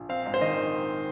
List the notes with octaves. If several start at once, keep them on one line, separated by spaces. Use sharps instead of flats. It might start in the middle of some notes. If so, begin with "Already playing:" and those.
Already playing: A#1
C4 F5
G#2
C5
D#3 D#5